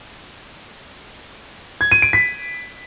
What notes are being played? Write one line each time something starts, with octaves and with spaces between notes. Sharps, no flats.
G#6
D#7
D7
B6